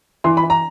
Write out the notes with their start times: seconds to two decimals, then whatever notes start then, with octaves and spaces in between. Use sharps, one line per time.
0.24 E3 C6
0.37 B5
0.43 E3
0.50 A#5